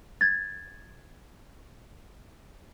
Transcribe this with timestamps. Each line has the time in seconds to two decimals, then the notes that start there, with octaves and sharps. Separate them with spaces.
0.21 G#6 A6